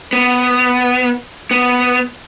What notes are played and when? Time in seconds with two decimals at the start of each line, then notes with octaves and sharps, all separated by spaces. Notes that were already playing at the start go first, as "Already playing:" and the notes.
0.13 B3
1.51 B3